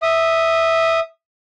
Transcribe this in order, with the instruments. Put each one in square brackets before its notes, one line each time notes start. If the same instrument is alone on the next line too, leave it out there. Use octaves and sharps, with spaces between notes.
[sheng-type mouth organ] E5 D#6